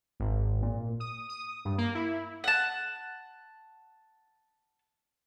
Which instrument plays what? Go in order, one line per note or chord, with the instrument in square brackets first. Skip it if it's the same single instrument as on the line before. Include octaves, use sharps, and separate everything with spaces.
[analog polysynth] G#1
A#2
D#6
D#6
G2
A#3
E4
[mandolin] F#5 A5